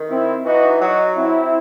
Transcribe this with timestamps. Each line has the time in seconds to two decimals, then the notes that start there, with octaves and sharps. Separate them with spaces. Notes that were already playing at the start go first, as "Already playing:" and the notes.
Already playing: D#3
0.09 C4 E4
0.45 E3 D#4 F#4
0.81 F#3 D#4 F#4
1.16 C4 E4